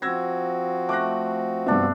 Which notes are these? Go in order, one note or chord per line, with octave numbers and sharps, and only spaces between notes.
F3 C4 F#4 E6 G#6 A#6
A3 D6 F#6 A#6
G2 C3 B3 D4 E5